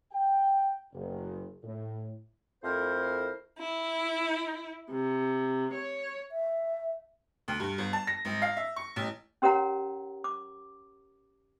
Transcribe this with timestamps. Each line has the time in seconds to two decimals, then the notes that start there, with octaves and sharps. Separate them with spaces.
0.12 G5
0.93 F#1
1.64 A2
2.64 F2 A3 E4 A#4 C5
3.59 E4
4.90 C3
5.72 C#5
6.32 E5
7.48 D2
7.60 G2
7.78 G1
7.93 A5
8.07 A#6
8.25 G#1
8.42 F5
8.57 E5
8.76 C#6
8.96 A1
9.42 C#4 G4 A#4 C#5 F#5 A#5
10.24 D6